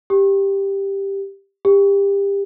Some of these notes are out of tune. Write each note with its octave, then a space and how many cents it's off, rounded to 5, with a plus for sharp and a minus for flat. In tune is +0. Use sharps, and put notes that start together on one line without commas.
G4 +5
G4 +25